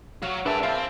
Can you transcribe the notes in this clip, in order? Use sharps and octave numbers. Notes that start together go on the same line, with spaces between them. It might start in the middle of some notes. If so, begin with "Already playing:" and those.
F#3 F#4 F5
G#3 A#3 D4 B4 E5 G5 A5
C4 F4 A5 B5